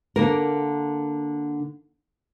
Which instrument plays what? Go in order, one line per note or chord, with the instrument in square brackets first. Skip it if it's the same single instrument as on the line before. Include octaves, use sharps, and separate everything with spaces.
[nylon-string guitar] D3 A#3 A#4